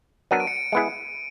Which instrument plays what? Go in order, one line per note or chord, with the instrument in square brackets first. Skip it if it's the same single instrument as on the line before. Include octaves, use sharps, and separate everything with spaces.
[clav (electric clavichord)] F#3 B3 D4 F#4 A#4 [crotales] D#7
[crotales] D7
C#7
D7
[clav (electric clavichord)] G#3 B3 E4 G#4